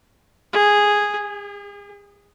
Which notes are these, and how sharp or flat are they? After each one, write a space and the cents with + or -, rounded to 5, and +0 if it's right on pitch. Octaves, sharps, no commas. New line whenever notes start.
G#4 -5
G#4 -40